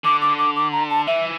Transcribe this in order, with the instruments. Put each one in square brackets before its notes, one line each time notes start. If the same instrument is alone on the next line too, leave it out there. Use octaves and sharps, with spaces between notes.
[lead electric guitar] D3 [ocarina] D6
[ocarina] D6
D6
D6
A#5
A5
[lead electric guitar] E3 [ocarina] E5